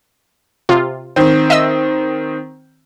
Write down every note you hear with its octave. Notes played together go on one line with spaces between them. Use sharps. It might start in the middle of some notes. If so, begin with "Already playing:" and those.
C3 F4
D#3 C4
D#5 E5 E6